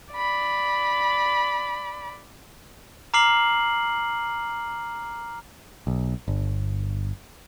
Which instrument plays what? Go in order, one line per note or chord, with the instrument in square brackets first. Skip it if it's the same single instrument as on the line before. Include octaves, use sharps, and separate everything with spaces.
[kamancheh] D5 B5
[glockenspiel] A#5 D6 F6 C7 F#7
[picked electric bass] B1
G1